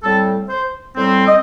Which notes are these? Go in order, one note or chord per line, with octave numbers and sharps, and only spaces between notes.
A2 G3 C4 A4
C5
A2 G3 C4
D#5